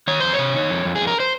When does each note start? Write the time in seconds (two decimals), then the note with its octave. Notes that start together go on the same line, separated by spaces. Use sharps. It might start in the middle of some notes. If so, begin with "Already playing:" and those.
0.08 D#3 C#5
0.20 F2 C5
0.33 C#5
0.39 C3
0.54 D#3
0.70 F2
0.85 F2
0.96 G#4
1.01 F2
1.07 A#4
1.20 C5